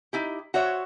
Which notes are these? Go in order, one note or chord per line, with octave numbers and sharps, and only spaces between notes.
D#4 E4 G4
F#4 C5 C#5 E5